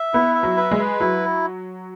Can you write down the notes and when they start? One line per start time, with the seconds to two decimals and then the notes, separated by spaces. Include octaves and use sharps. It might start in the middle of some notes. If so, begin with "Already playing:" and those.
Already playing: E5
0.14 B3 E4
0.35 E5
0.43 F#3
0.57 B4
0.71 G#3
0.79 B4
1.00 F#3 E4